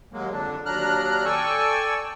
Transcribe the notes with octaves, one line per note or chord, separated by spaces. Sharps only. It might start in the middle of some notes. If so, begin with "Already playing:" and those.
D#2 F#3 G#3 A#3
F2 D3 D4
D#2 F#3 D4 A#5 F6 F#6
A4 D5 G5 G#5 C#6 E6